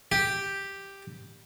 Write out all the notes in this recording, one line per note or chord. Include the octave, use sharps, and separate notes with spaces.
G4